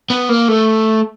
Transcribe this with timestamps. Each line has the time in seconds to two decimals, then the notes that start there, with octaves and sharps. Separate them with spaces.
0.10 B3
0.29 A#3
0.49 A3